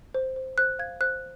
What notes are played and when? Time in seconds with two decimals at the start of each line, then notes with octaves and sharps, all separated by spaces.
0.14 C5
0.36 C5
0.58 C5 F#6
0.79 F5 G#6
1.01 C5 F#6